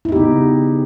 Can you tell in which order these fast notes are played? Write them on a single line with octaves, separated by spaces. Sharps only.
E4 D#4 G4 B3 C#3